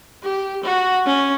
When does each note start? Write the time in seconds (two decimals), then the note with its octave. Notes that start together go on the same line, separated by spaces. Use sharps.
0.23 G4
0.63 F#4
1.06 C#4